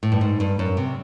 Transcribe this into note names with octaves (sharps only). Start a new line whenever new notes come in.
A2
G2
G#2
G2
F#2
C3